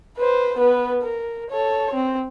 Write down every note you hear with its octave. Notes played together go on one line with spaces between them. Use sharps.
B4 C5
B3 B4
A#4
A4 C#5
C4